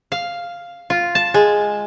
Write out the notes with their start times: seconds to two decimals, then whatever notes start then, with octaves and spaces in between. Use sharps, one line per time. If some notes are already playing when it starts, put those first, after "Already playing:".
0.12 F5
0.90 F4
1.15 A5
1.34 G#3